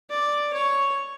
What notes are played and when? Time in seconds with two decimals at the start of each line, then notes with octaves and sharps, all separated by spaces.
0.10 D5
0.54 C#5